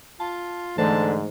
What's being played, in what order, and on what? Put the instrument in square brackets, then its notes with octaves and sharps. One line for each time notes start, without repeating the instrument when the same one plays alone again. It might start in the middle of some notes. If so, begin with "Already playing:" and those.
[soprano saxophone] F4 [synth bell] A5
[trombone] G#2 [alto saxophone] D3 [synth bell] E3 A3 C5 [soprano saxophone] A5